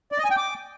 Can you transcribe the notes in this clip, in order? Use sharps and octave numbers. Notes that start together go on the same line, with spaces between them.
D5
D#5
G#5
G5
D6